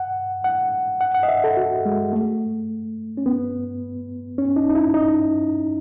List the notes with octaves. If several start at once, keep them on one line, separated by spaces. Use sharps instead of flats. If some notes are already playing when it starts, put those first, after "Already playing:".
Already playing: F#5
F#5
F#5
F#5
D#5
E5
A4
F#4
G#3
A3
C#4
B3
C#4
D#4
D#4
E4
D#4